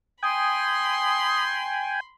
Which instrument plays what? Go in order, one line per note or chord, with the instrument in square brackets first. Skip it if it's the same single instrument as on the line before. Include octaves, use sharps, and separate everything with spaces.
[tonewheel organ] G5 G#5 [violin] B5 C6 [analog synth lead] D#6